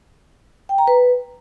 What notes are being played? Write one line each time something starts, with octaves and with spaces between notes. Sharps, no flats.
G5
A#5
B4